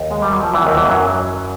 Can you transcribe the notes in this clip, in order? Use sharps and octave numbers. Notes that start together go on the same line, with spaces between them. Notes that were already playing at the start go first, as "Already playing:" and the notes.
Already playing: D#2
G#3
G3
F#3
F3
E2 E3
D#2 D#3
E2 E3
F#2 F#3